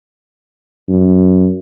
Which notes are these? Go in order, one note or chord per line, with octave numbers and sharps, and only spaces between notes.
F#2